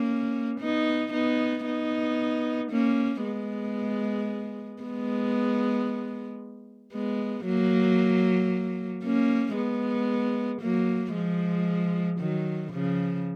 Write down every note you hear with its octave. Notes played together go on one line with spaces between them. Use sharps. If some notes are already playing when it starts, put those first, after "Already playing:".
Already playing: A#3 C#4
B3 D#4
B3 D#4
B3 D#4
A#3 C#4
G#3 B3
G#3 B3
G#3 B3
F#3 A#3
A#3 C#4
G#3 B3
F#3 A#3
F3 G#3
D#3 F#3
C#3 F3